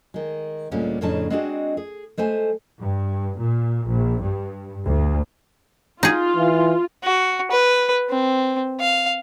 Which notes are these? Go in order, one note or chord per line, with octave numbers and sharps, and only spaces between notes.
D#3 G#3
D2 A#2 G3 G#3 C#4
F2 A2 C#3 D4 D#4 A5
G#3 C4 D4 F#4 G#4 D#5
G#4
G#3 A3 C5 G#5
G2
A#2
A#1
G2
D2
D#4 F4 G#4
E3
F#4
B4
C4
F5